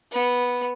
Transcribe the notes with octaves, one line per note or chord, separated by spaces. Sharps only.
B3